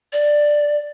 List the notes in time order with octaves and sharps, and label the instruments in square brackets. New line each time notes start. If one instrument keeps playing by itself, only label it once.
[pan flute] D5